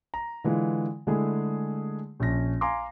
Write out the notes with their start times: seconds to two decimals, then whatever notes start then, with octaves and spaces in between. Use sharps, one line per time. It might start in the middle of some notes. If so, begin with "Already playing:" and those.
0.14 A#5
0.44 D3 E3 G#3 F4
1.07 D3 G#3 A3 E4 G#4
2.20 A#1 C#4 A#6
2.61 F5 G#5 A#5 C6 D6